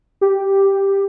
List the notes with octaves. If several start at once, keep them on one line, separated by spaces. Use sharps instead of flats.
G4